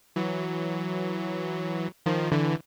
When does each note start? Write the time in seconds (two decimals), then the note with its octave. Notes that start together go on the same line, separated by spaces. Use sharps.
0.16 E3 F#3
2.06 D#3 F3
2.32 D3 E3